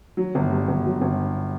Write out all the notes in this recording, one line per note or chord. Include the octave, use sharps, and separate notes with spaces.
F#3
G1
G2
G1
F#3
G1